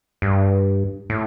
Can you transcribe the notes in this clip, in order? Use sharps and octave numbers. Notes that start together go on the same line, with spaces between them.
G2
A2